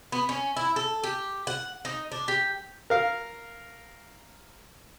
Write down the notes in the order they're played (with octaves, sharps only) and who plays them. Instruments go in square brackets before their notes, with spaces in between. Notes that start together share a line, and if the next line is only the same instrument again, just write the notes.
[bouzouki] B3
C#4
E4
A4
G4
F#5
D#4
D4
G4
[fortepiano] A#4 F5